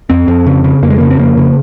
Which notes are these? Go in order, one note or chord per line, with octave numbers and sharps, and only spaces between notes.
F2 C4
F2
C#3
C#3
F2 A#3
G#3
C#3 A#3
C4
F2 A#3
C#3